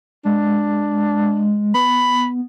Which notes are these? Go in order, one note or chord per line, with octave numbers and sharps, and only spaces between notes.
G#3 D4
B3 B5